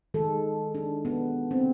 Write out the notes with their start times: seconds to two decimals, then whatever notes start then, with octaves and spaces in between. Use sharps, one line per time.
0.14 D#3 G#3 A4
0.75 D4
1.05 B3
1.51 C4